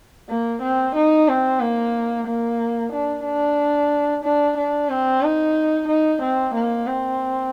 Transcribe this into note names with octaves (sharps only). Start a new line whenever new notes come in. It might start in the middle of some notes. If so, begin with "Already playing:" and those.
A#3
C4
D#4
C4
A#3
A#3
D4
D4
D4
D4
C4
D#4
D#4
C4
A#3
C4